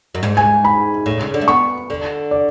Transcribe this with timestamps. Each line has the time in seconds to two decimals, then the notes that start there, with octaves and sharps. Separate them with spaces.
0.15 F#2
0.23 G#2
0.37 G#5
0.64 B5
1.06 A2
1.21 C#3
1.34 D3
1.41 A3
1.48 B3 C#6
1.90 D3
2.31 D5